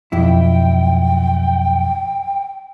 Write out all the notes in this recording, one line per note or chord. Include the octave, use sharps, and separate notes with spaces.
B1 F2 E4 G5